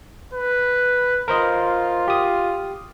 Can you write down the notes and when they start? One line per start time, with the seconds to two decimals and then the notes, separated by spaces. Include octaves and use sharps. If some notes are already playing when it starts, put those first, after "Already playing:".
0.33 B4
1.28 F4 A#4 C5 D#5
2.08 G4 D#6